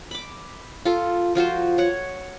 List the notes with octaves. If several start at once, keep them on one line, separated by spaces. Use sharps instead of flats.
B5 D6
F4 A4
F3 F4 F#4 C5
C#5 F#5